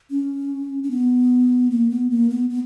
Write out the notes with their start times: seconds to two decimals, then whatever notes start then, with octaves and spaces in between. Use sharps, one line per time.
0.10 C#4
0.83 C#4
0.91 B3
1.71 A#3
1.90 B3
2.10 A#3
2.30 B3
2.50 B3